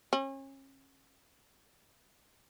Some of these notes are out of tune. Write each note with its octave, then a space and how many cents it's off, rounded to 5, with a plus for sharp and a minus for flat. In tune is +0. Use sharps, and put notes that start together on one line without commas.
C#4 -35